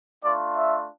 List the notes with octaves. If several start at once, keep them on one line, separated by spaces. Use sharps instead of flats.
A3 D4 F4 D5
E5